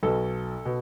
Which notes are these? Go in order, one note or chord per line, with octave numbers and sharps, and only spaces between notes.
B1 B2 A4
B2